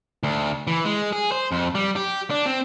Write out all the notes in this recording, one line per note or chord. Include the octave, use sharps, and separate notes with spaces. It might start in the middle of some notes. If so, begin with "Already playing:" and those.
D2
E3
G#3
G#4
C5
F2
G3
G4
D4
C4